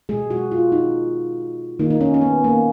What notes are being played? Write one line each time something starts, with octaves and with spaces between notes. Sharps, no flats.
B2 G#3 G#4
F#4
F4
D#4
D#3 A#3 D#4
D#4
C#4
C#4
B3
A#3